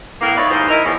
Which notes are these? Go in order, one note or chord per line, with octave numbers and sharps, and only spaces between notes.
A2 A#3 B3
D#4 F4 B4 C#5 D5 E5
D#2 G#2 D#4 C5
E4 A#4 D#5
E2 F3 C#5